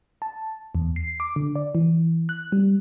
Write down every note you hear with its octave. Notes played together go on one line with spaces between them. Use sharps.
A5
E2
C7
D6
D3
D5
E3
F#6
G3